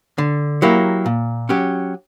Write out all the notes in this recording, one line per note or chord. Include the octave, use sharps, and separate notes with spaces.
D3
F#3 A#3 E4 G4
A#2
F#3 C#4 G4